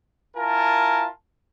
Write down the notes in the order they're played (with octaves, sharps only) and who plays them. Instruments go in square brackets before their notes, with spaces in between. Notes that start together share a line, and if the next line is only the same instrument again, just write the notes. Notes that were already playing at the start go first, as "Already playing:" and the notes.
[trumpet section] E4 F4 A#4 G#5 A5